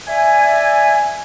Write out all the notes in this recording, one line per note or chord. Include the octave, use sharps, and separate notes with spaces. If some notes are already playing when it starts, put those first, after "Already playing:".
D5 E5 G#5